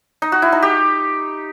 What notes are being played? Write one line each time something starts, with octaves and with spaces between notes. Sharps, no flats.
D#4
F#4
E4
D#4
G4